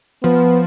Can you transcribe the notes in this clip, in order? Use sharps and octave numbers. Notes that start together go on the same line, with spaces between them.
F3 B3